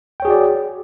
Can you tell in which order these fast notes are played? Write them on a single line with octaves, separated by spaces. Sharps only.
G5 C#5 G#4 F#4 D5